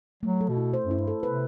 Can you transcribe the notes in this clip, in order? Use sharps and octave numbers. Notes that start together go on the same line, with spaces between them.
F#3 A3
A4
B2
E4
C5
F#2
E4
G2
A4
C3 B4